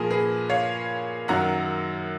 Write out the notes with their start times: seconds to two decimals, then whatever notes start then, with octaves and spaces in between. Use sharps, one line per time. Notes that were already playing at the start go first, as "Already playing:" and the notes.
Already playing: A#2 F3 G#4 A#4
0.11 G#4 B4
0.50 C#5 F5
1.28 F#2 D#3 F#3 F#5 A#5